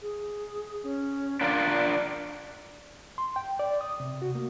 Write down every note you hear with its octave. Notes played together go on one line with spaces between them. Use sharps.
G#4
C#4
D4 F4 A#4 D5
C6
G5
D5
D#6
C3
F#4
A#3